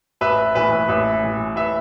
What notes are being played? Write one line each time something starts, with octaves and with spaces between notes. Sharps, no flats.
A1 B4 E5
A2 E3 B4 E5
A1 B4 E5
A2 E3
A1 B4 E5